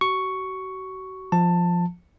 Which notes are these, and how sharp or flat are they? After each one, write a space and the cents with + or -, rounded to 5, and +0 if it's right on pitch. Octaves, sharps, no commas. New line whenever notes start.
F#4 +35 C#6 +5
F3 +0 A5 +15